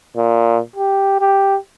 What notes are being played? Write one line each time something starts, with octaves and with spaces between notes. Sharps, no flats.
A#2
G4
G4